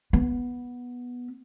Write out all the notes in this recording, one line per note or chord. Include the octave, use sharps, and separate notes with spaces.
B3